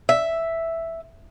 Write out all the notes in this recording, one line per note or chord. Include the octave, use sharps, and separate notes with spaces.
E5